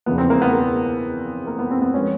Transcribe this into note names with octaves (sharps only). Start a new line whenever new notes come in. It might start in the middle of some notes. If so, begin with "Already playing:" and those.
E2 C#3 F3 A#3 B3
C4
A#3
B3
A#3
A#3
B3
C4
B3
F3 G#3 C#4